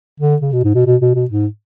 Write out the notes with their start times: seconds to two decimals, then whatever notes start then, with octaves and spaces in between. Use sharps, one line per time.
0.20 D3
0.42 C#3
0.52 B2
0.64 G#2
0.75 B2
0.86 B2
1.01 B2
1.15 B2
1.31 G#2